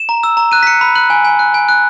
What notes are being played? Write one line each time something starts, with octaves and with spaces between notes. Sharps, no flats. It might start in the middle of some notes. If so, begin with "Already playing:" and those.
Already playing: E7
A#5
E6
A#5
F#6 D#7
B6
F#6 C#7
B5
F#6 F#7
G#5
G#5
F#6
G#5
F#6